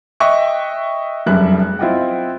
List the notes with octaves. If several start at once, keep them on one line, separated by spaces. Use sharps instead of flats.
D#5 E5 G5 C#6 F#6
F1 F#2 G3 G#4 E5 F#6
C4 E4 F4 D#5 F#5 G5